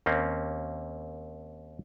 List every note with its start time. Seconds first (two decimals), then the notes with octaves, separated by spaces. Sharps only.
0.06 D#2 A#3 C4 C#4